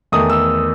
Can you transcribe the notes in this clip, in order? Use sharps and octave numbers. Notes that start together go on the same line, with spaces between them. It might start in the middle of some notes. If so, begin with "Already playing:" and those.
E2 D#3 A3 D#6
E6